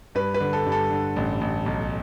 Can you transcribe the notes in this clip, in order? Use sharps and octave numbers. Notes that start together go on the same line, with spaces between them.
G2 B4
B4
D3
A4
G2
A4
D3
A1
A1
B1